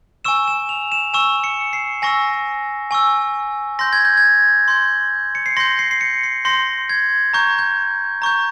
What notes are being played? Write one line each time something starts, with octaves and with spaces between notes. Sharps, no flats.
G#5 C#6 E6 E7
E7
F7
E7
G#5 C#6 E6 E7
C#7
C7
G#5 C#6 E6 A#6
G#5 C#6 E6
C6 G6 A#6
G#6
G6
G#6
C6 G6
C#7
C7
C6 G6 A#6
C7
C7
C#7
C7
C6 G6 A#6
G#6
A#5 C#6 G6
G6
A#5 C#6 G6